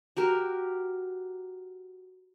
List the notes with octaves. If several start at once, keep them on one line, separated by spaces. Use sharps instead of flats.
F#4 G4 A#4